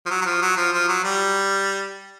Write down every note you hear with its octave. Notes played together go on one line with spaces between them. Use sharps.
F3
F#3
F#3
F3
F#3
F3
F3
F#3
G3